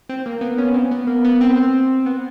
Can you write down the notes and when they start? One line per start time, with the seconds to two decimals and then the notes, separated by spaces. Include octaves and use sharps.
0.09 C4
0.26 A#3
0.41 B3
0.58 C#4
0.74 C4
0.91 B3
1.07 A#3
1.25 B3
1.41 C4
2.06 B3